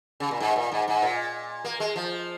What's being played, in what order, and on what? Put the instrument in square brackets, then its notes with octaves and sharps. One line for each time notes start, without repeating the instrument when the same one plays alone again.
[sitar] C#3
A#2
G#2
A#2
G#2
G#2
A#2
A#3
G#3
F3